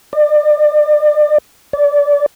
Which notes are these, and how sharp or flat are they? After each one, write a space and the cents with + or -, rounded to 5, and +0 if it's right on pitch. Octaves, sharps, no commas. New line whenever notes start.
D5 +35
D5 -25